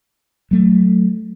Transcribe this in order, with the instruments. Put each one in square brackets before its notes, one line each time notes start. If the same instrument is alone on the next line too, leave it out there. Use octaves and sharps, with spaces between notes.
[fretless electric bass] F#3 A3